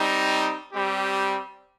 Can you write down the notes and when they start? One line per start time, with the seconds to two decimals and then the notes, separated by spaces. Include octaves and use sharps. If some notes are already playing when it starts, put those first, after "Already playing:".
Already playing: G3 C4 D#4
0.71 G3 C4 G4